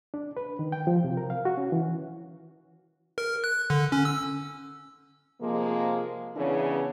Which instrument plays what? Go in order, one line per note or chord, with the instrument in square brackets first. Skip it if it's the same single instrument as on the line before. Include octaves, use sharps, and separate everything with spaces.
[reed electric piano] D4
B4
D#3
G5
F3
C3
A#4
F5
F#4
C#4
E3
[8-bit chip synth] A#4
F#6
D3
C#4
E6
[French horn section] C3 F3 G#3 A#3
C#3 E3 B3 C#4 D4